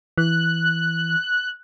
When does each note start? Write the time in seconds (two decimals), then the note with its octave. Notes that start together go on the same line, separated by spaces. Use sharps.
0.18 E3 F#6